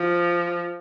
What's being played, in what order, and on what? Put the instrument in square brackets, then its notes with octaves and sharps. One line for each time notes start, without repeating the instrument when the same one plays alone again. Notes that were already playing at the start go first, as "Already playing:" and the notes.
Already playing: [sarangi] F3